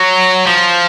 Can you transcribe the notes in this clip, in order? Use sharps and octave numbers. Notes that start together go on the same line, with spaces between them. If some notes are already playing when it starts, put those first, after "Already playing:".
Already playing: F#3
F3